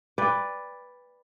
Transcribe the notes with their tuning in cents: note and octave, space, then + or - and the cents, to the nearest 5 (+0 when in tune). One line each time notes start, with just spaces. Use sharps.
B4 +0 D5 +0 G5 +35